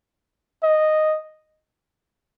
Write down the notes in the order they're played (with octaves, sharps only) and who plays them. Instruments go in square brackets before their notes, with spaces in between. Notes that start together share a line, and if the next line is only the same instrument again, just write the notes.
[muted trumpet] D#5